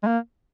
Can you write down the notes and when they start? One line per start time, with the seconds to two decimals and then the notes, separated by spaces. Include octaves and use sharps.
0.03 G#3
0.07 A#3